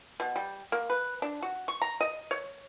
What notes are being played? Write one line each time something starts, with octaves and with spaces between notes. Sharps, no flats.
B2
G3
A#3
B4
D4
F#4
C#6
A#5
D#5
C#5